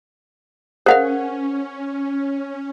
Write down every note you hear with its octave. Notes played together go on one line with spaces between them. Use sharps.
C#4 G#4 A#4 C5 F5 F#5